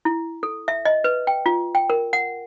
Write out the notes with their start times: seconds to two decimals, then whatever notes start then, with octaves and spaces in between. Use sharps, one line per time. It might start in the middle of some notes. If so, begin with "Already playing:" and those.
0.05 E4
0.43 A4
0.68 E5
0.85 D#5
1.04 B4
1.27 G5
1.46 F4
1.75 G5
1.90 A#4
2.13 F#5